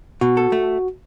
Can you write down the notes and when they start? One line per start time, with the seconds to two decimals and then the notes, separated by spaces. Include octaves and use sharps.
0.21 B2 F#4
0.37 A4
0.52 A3